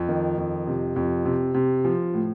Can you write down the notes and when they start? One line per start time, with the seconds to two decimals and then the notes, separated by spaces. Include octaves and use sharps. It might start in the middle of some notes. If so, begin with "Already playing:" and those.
Already playing: F2
0.09 D#3
0.38 F2
0.67 C3
0.96 F2
1.25 C3
1.54 C3
1.85 F3
2.14 A2